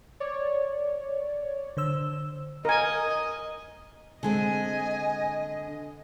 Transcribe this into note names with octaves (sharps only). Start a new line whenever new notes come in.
C#5 D5
D3 C5 E6
A#4 D#5 G#5
D3 G#3 C4 D#5 G#5